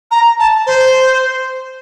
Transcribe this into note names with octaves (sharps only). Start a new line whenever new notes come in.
A#5
A5
C5